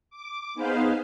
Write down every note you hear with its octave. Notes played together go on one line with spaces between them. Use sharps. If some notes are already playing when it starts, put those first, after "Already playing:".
D6
B3 D#4 G#4 B4 C5 F5